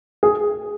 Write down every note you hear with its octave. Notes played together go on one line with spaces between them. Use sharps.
G#4